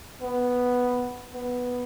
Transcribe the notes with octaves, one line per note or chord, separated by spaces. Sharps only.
B3
B3